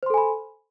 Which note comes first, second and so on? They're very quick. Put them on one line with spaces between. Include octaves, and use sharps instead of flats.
C5 C6 A4 G#5 B5